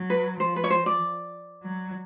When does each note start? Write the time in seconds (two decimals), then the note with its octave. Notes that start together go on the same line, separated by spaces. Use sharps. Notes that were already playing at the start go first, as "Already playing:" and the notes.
Already playing: F#3
0.10 B4
0.40 F3 C5
0.56 B4
0.64 C#5
0.70 C5
0.86 D5
1.63 F#3